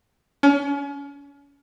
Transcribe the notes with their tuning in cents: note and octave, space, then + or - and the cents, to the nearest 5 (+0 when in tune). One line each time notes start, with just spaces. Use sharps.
C#4 +35